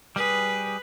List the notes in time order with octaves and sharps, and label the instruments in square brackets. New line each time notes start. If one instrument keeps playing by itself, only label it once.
[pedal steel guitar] G3 G#4 [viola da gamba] B4